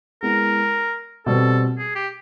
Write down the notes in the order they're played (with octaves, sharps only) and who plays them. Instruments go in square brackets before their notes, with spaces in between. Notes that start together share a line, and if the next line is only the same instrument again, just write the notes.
[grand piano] G#3 B3 E4 [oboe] A#4
[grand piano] B2 G3 C4 [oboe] A4
[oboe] G#4
G4